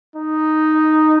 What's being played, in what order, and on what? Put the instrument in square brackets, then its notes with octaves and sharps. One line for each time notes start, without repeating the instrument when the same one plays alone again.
[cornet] D#4